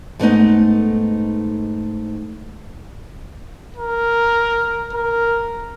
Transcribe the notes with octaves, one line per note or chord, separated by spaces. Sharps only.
G#2 A3 B3 D#4
A#4
A#4